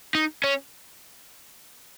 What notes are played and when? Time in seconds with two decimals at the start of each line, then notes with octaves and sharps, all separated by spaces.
0.15 D#4
0.44 C#4